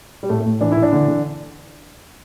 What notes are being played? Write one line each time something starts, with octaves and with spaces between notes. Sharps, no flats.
G3
A2 A3
A3
A2
E3 D4
E4
E3
D4
D3
D3